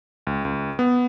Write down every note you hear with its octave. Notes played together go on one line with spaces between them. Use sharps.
C#2
C#2
B3